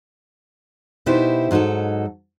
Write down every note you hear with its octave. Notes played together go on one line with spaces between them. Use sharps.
B2 D#4 E4 G4 C5
G#2 F#3 D#4 F#4 A4